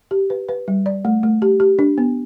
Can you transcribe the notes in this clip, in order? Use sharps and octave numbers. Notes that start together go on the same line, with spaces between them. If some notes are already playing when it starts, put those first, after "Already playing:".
G4
B4
B4
G3
D5
A3
A3
G4
G4
D4
B3